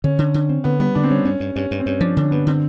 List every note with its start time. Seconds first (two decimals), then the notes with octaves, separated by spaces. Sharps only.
0.04 D3 C#4
0.19 D3
0.34 D3
0.49 C4
0.64 D3 B3
0.80 G3 B3
0.95 D3 D4
1.04 C4
1.10 G3 C#4
1.25 G2 C#4
1.40 G2
1.56 G2 C#4
1.71 G2
1.79 C4
1.86 G2 C#4
2.01 F3 D4
2.16 D3 C#4
2.31 G2 B3
2.47 D3 C4